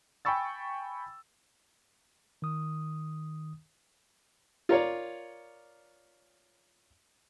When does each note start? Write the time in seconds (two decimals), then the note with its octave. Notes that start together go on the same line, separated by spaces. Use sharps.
0.25 G5 G#5 B5 C#6 E6 A6
2.42 D#3 D#6
4.69 F4 A#4 C#5 D5